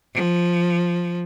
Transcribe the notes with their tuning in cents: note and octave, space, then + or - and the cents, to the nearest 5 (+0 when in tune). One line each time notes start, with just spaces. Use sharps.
F3 +0